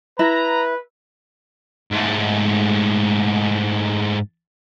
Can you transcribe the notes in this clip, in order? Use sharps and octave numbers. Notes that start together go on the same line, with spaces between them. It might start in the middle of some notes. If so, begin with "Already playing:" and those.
E4 B4 A#5
G#2 A3